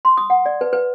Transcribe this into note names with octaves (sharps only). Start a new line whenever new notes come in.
C6
D#6
F#5
D5
B4
B4